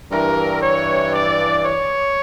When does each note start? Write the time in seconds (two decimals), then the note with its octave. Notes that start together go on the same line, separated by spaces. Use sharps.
0.11 G2 E3 A#4
0.62 C#5
1.13 D5
1.64 C#5